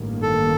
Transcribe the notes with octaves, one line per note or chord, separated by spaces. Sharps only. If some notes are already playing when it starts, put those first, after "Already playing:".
Already playing: A1 G2 D#3 A#3
A4